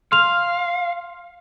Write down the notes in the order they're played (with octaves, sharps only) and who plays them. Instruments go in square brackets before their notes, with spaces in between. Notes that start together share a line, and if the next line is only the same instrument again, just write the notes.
[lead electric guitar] F5 [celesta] C6 F6 F7